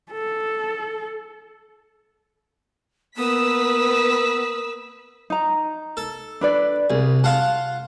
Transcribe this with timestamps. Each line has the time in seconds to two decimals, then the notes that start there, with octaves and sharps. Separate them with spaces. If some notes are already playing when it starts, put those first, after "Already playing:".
0.12 A4
3.17 A#3 B3 B4 D#6 E6 B6
5.30 D#4 A#5
5.97 A4
6.41 D4 B4 D5
6.90 C2 G#4
7.24 F4 F5 F#5 A5